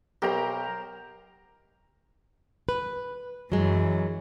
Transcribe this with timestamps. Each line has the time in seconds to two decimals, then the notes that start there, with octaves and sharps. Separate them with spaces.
0.22 B1 G4 A#4 C5 A#5
2.69 B4
3.52 F#2 E3 F#3 G#3